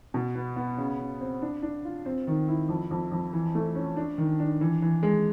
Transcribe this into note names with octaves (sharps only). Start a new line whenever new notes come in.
B2
B3
B3
C#3
C#3
C4
D4
D4
F4
C4
D#3
E4
F2
F2
F2
E3
A3
C#4
D4
D#3
D4
E3
E3
G#3